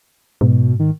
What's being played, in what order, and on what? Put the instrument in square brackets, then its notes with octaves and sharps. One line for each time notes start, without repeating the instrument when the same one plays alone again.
[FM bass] G#2 [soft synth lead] B2
[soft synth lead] D#3